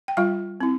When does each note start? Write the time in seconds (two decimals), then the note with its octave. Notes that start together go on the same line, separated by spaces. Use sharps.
0.08 G5
0.17 G3 F4 F5
0.61 C4 E4